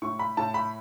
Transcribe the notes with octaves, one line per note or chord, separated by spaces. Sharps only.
A2 C#6
B5
A2 A5
B5